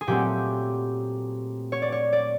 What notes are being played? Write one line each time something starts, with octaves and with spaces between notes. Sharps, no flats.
G#4
A#2 F#3 A3 C4 G4
C#5
D5
C#5
D5